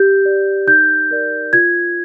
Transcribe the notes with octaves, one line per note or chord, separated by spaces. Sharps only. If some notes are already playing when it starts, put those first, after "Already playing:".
Already playing: G4 G6
D5
D#4 G6
A#4 D5
F4 G#6